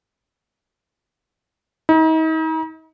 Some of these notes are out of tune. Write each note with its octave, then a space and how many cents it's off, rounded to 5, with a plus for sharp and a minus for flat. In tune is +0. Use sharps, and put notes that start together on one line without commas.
D#4 +40